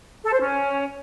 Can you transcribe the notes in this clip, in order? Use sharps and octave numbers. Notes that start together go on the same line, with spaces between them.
A4
C5
C#4